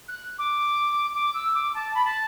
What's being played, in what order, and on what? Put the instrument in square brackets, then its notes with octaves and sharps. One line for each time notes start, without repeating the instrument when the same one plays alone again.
[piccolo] F#6
D6
D6
E6
D6
A5
B5
A5